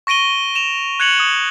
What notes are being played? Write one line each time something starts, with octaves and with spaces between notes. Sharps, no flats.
C#6 A#6 D7 D#7 G7
E7 F7
F#6 G#6 C#7 F7 F#7
D#6